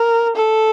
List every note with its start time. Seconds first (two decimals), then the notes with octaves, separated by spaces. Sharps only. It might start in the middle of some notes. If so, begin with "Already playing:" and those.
Already playing: A#4
0.36 A4